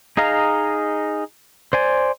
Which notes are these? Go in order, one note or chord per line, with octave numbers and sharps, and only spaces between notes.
D#4 G#4 D#5 F5 A#5
C5 D5 G#5